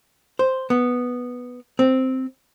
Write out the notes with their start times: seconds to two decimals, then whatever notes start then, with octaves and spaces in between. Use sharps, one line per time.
0.39 C5
0.70 B3
1.79 C4